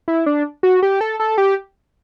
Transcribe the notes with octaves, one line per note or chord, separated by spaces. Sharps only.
E4
D4
F#4
G4
A4
A4
G4